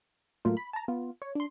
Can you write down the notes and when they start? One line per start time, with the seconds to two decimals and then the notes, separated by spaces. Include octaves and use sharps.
0.45 A2 F#3 A3 A#3 F4
0.57 B5
0.73 A5 A#5
0.88 B3 F4
1.22 C#5
1.35 D4 C6